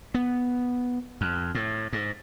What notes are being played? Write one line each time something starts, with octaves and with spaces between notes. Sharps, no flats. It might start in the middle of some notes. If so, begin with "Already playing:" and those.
B3
F2
A2
G#2